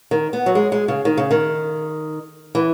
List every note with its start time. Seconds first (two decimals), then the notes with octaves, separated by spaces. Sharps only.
0.11 D#3
0.33 B3
0.46 F#3
0.55 G#3
0.72 G#3
0.88 C#3
1.05 D#3
1.17 C#3
1.31 D#3
2.55 E3